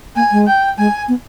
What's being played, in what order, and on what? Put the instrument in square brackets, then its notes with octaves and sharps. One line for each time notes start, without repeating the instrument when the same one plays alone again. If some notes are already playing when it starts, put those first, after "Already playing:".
[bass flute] A#3 [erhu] G#5
[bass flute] G#3
[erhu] G5
[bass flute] G#3 [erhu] G#5
[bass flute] B3